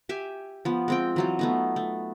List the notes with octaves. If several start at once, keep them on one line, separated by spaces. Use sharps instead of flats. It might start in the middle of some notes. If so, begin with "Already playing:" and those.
G4 E5 G#5
F3 B3
G#3 C4 G5
E3 F#3 F4
A3 B3 D#4
A3